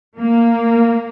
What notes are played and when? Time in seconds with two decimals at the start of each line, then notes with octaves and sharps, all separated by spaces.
0.19 A#3